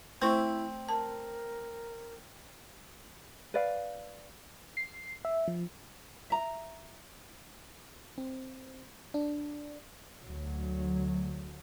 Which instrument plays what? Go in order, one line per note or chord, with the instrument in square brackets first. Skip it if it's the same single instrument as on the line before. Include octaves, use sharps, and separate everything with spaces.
[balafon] A3 C5 C#6 [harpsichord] C4 [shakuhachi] E4
[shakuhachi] A#4 [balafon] A5
[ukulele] B4 D5 F5
[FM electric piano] C7
E5
F3
[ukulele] E5 A#5
[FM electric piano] C4
D4
[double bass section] D2 F#3